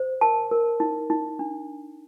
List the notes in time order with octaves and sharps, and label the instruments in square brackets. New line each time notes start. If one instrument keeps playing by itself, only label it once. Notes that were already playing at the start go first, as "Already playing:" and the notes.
Already playing: [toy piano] C5
A#4 A5
A#4
D#4
D#4
D4